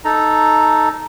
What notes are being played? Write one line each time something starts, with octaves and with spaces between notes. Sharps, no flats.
D#4 A4 A#5